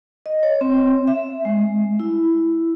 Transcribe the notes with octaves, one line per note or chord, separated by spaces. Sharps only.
D#5
C#5
C4
E5
G#3
E4